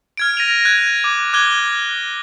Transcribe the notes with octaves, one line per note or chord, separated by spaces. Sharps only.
F6 G#6 D7
A#6 D#7 F7
F#6 G#6
D6
D6 F#6 G#6 G7